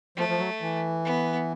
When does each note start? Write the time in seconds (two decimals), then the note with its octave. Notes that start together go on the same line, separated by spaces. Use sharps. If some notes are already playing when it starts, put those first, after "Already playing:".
0.16 F3 A3
0.29 F3
0.38 F#3
0.61 E3
1.05 B3